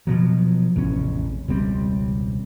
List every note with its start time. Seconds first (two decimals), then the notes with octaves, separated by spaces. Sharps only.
0.07 B2 F3 F#3
0.76 A1 E2 C3 C#4
1.48 E1 C#2 G3 C4